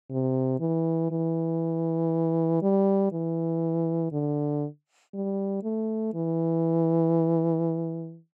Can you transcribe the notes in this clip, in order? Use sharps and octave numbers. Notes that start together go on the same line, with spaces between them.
C3
E3
E3
G3
E3
D3
G3
A3
E3